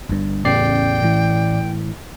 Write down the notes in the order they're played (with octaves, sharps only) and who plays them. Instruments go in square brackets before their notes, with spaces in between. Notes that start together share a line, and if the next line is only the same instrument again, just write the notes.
[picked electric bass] G1 G2
[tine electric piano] A1 D5 C7 [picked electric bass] E2 C#3 [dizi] G5
[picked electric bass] A2 E3